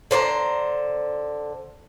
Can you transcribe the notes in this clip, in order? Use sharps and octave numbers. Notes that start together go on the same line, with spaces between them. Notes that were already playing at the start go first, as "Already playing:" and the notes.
D3 C5 D5 A#5